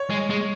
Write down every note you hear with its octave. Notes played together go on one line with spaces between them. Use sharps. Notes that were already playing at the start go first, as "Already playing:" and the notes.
Already playing: C#5
G#3
G#3